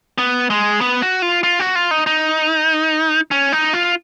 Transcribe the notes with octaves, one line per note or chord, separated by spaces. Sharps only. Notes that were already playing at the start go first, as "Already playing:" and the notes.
B3
G#3
B3
F#4
F4
F4
F#4
F4
D#4
D#4
C#4
D#4
F4